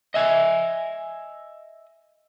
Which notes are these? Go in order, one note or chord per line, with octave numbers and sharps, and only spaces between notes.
D#5 E5 G#5